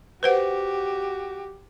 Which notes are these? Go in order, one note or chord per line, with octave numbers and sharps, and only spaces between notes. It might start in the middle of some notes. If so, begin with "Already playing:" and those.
F#4 G4 B4 C5 F#5